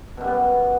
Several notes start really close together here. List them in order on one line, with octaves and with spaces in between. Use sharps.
B2 F#2 G3 B3